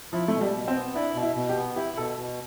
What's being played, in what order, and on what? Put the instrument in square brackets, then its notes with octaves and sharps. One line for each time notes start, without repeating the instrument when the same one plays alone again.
[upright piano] F3 [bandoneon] E4
[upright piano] A3
[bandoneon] B2
[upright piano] G3
[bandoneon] B2
[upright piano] C4
[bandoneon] B3
[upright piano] D4 [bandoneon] E4
[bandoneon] B2
[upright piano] E4
[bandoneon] B2
[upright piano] G4
[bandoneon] B3
[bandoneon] E4 [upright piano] G4
[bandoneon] B2 [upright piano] A4
[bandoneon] B2